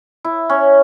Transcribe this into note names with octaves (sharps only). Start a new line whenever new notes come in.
E4
C#4